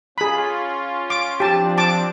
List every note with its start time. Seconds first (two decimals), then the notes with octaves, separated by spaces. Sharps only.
0.18 C#4 F4 G#4 B5
1.10 D6
1.40 F3 C4 D4 G4 A5
1.78 A5 D6